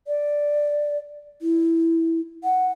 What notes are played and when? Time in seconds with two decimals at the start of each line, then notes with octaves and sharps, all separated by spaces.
0.07 D5
1.42 E4
2.44 F#5